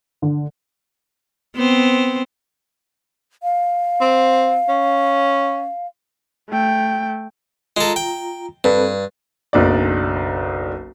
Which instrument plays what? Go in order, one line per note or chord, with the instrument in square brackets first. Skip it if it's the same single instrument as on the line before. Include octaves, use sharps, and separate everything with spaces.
[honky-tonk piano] D3
[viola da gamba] B3 C4 C5
[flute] F5
[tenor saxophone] C4
C#4
[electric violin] A3 G5
[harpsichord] G#3 A4 [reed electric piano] F4 A#5
[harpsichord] G5
[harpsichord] G2 [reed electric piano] C4 A4 B4
[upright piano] F#1 B1 D4 D#4 D5